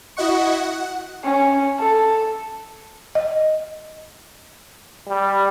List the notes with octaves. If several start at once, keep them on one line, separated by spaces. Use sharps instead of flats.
E4 F#4 D#5 F#5 C#6
F#5
C#4
A4
D#5
G3